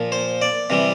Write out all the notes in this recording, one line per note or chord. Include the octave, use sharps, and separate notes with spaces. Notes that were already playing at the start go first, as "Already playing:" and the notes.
Already playing: A#2 F3
C5
D5
C3 E3 G3